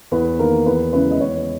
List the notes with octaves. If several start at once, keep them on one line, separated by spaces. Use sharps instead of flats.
E2 B4
D#3 A#3 A#4
E2 B4
C#3 G#3 C#4 E4 B4
D#5
E2 C#5